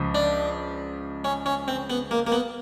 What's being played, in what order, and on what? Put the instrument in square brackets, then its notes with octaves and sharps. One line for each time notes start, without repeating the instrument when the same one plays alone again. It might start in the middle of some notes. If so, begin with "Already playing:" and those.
Already playing: [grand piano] C#2 F3
[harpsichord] D4
C#4
C#4
C4
B3
A#3
A#3
B3